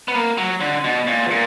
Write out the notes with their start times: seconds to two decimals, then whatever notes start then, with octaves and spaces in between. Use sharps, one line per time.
0.08 B3
0.15 A#3
0.37 F#3
0.61 D3
0.84 B2
1.07 A#2
1.30 A#2